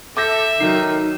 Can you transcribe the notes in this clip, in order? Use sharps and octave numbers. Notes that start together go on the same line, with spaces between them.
A4 E5 D6 G6 A#6
D#3 F#3 D#4 C7